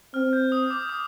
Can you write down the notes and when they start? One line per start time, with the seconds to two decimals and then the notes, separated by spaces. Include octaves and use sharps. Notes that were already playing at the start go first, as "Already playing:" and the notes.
0.14 C4 F6
0.33 G6
0.52 D#6
0.71 D6
0.89 D#6